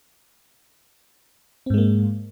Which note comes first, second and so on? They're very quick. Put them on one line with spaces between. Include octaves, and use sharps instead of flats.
C4 G#2 G#3 A#3